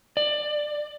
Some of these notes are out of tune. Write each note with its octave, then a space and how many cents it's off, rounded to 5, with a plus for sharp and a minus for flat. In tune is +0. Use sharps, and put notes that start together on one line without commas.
D5 +20